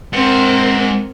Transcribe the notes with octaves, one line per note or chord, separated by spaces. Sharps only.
G#3 C4 A#4 F#5